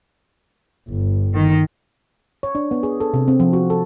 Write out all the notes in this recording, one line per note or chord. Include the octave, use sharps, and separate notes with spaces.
G1
D#3
C#5
D4
B3
G#4
A4
C3
C4
F3
F#4
A4